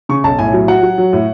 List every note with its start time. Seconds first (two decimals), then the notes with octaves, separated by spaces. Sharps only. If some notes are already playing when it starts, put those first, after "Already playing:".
0.09 C#3 C#6
0.24 B1 A5
0.39 A2 G#5
0.53 F#3
0.68 F#3 F#5
0.83 F#3
0.98 F#3
1.13 A2